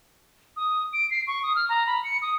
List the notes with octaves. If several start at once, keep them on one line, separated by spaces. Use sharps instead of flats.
D#6
D7
C7
C#6
D#6
F6
A#5
B5
C#7
D#6